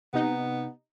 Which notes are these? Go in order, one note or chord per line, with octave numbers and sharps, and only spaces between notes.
C3 B3 D#4